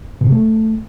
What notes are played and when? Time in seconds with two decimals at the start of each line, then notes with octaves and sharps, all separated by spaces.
0.21 B2
0.26 C3
0.32 A3